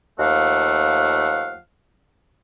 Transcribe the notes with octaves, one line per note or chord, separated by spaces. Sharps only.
D#2 F3 A3 F5 F#5